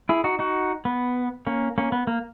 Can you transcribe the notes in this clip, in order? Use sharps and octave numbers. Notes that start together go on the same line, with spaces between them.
E4 G#4
D#4 F#4
D#4 F#4
B3
A#3 C#4
A#3 C#4
B3
A#3